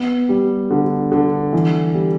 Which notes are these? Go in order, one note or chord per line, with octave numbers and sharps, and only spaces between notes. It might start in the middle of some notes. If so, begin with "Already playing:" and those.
Already playing: B3
G3
D3
D3
E3
G3